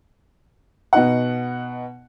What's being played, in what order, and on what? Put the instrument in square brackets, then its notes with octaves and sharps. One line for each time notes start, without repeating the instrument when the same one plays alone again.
[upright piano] B2 D#4 F#5